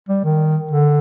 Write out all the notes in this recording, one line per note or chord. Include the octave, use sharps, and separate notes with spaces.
G3
D#3
D3